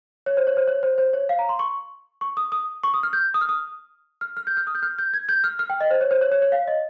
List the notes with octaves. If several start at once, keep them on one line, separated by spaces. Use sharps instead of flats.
C#5
C5
C#5
C5
C#5
C5
C5
C#5
F5
A#5
C6
C#6
C#6
D#6
D#6
C#6
D#6
F6
G6
D#6
F6
D#6
F6
F6
G6
F6
D#6
G6
F6
G6
G#6
G6
F6
F6
G5
D#5
C5
C#5
C5
C#5
C#5
C#5
F5
D#5